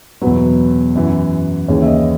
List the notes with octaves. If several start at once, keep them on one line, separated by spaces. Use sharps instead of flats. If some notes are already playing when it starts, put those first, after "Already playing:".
E2 B2 F#3 B4
F#2 E3
D#2 C#3 E3 C#5
E5
D#5